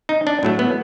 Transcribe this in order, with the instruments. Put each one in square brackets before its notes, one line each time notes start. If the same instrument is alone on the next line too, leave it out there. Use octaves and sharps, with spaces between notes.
[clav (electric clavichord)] D#4
D4
A2 F#3 A3
B3